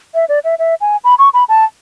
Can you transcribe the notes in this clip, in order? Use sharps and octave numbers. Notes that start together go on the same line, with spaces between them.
E5
D5
E5
E5
G#5
B5
C#6
B5
A5